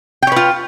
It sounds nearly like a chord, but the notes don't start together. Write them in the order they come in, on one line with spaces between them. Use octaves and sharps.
G5 C#5 B4 F4